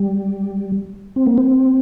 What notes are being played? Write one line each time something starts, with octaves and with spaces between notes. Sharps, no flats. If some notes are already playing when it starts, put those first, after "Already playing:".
Already playing: G3
C4
A#3
C4